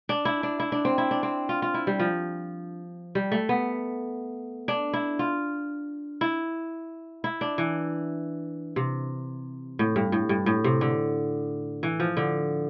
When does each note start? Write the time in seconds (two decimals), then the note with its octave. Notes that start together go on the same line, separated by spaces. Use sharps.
0.09 D4
0.25 E4
0.43 D4
0.60 E4
0.72 D4
0.85 C4
0.98 E4
1.11 D4
1.23 C4
1.49 F4
1.62 F4
1.74 E4
1.87 G3
2.00 F3
3.15 G3
3.32 A3
3.49 B3
4.68 D4
4.93 E4
5.19 F4
6.21 E4
7.24 E4
7.41 D4
7.58 E3
8.76 C3
9.79 A2
9.96 G2
10.12 A2
10.29 G2
10.46 A2
10.64 C3
10.81 D3
11.83 E3
12.00 F3
12.17 D3